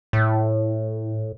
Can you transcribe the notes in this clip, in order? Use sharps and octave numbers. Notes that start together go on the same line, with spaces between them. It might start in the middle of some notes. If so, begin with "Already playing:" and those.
A2